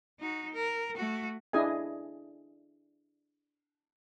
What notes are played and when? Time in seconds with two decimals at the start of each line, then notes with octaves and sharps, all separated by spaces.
0.20 D#4 F#4
0.53 A#4
0.97 A3 F#4
1.53 D4 E4 G#4 D#5 G#5